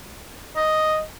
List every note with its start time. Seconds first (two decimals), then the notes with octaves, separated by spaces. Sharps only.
0.56 D#5